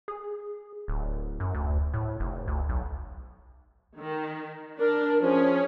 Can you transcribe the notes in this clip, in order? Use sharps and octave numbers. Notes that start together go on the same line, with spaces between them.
G#4
D1
F#2
D2
A2
F1
D2
B1
D#3
D4 A#4
F3 C#4 G#4